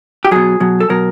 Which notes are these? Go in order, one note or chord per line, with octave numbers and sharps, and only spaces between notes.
G4
B2 F#3 G#4
B2 F#3
A4
B2 F#3 A#4